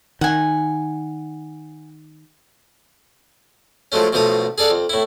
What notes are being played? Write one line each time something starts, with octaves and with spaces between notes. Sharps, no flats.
D#3 F#5 G#5
F3 F#3 G#3 A3 C#4
B1 B2 F3 A3 A#5 D#6
G#4 A4 D5 F5 F#5
F2
A2 E4